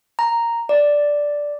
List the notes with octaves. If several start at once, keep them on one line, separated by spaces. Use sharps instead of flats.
A#5
D5